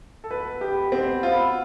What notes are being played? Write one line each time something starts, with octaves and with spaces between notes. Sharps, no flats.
A4
B2 B4
B3 E4 G4
B2 C4
B3 E4 F4